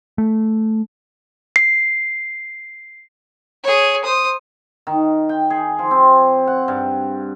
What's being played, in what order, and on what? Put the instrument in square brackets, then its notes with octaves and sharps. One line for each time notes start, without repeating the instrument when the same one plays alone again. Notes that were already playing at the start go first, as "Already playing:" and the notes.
[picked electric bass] A3
[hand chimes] C7
[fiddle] G#4 C#5
C5 D#6
[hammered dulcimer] D#3
G5
G#4
F3
C4
F#5
G2